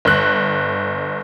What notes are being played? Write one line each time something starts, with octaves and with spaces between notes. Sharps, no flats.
G1 F#6